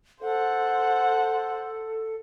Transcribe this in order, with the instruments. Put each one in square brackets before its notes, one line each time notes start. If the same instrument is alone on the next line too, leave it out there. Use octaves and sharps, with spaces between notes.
[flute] A4 [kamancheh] C5 F#5